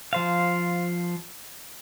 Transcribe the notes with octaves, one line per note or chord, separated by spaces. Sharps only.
F3 C5 F5